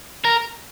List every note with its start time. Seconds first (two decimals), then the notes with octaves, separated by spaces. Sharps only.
0.24 A#4